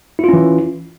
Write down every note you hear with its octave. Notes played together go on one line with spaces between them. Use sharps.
E3 C#4 E4 F4